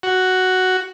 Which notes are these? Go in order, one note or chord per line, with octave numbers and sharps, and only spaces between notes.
F#4